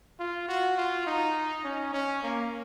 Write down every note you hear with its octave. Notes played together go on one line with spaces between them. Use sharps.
F4
F#4
F4
D#4
C#4
C#4
A#3